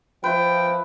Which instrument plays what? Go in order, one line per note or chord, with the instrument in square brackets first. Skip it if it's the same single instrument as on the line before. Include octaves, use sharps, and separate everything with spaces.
[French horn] F3 [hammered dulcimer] B4 E5 [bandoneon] G5